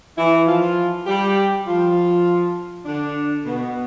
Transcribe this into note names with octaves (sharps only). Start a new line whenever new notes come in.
E3 E4
F3 F4
G3 G4
F3 F4
D3 D4
B2 B3